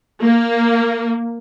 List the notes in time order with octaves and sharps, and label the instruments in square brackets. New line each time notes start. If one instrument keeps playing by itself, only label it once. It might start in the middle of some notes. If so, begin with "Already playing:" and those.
[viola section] A#3